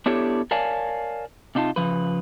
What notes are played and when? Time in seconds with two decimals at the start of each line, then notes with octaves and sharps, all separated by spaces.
0.06 B3 D4 E4 G4 A4 C#5
0.51 A#4 C#5 D5 F5 G#5 A5
1.55 C3 D4 D#4 F4 A5
1.76 C#3 F3 B4